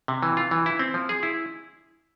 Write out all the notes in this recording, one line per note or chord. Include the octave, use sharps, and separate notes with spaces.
C3
E3
F4
E3
E4
C4
F3
G#4
E4